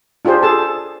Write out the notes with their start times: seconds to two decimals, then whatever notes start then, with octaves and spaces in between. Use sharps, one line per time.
0.25 D4 F4 G4 G#4 C5
0.43 G#4 A4 A5